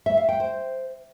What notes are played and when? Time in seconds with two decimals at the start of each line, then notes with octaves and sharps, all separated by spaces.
0.06 E5
0.17 F5
0.29 G5
0.40 C5